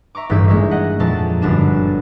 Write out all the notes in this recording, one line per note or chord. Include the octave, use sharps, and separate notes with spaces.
E5 A#5 C#6 D6
D#1 A1 G2 E5 G6 G#6
G#3 A#3 E5
D#5 F#5
F2 A#2 F3 G#3 A5
G1 F#2 D4 E7